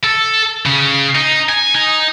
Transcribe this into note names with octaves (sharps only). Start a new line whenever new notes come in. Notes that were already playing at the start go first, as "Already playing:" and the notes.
A4
C#3
D#4
G#5
D#4